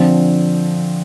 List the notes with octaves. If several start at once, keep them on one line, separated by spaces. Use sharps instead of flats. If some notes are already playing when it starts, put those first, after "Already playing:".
Already playing: D3 F3 C4